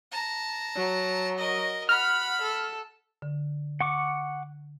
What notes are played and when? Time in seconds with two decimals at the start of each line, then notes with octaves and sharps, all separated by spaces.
0.12 A5 A#5
0.75 F#3
1.37 A#4 D#5
1.89 F#5 B5 F6
2.41 A4
3.22 D3
3.81 F#5 C#6 D6